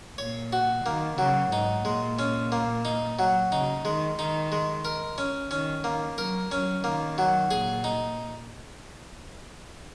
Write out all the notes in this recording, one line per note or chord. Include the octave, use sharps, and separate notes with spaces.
A#2 C#5
F#4
D#3 A#3
C#3 F#3
G#2 D#4
A#2 G#3
C#4
A#3
D#4
F#3
C#3 D#4
D#3 G#3
D#3 D#4
G#3
A#4
C#4
D#3 C#4
D#3 A#3
F#3 A#4
F#3 C#4
D#3 A#3
F#3
A#2 G#4
D#4